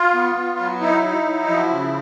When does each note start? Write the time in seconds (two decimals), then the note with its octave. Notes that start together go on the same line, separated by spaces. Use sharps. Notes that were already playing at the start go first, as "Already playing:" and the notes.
Already playing: F4
0.14 B3
0.35 B3
0.58 F#3
0.80 D#4 E4
1.03 D#4
1.25 F#3
1.47 F3
1.70 C#3